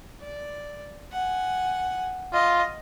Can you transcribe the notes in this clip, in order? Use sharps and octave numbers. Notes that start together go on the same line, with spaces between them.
D5
F#5 G#5
F4 D#5